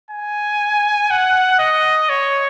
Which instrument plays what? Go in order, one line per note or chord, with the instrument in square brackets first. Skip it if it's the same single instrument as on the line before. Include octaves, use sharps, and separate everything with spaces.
[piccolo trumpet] G#5
F#5
D#5
C#5